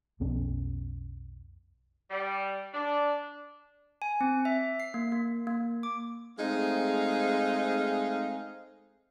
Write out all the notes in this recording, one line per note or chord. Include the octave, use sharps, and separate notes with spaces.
B1 F2 B3 C#4
G3
D4
G#5
C4
E5
C7
A#3
A#3
A#3
D6
G#3 A3 C4 D#4 G#4 F5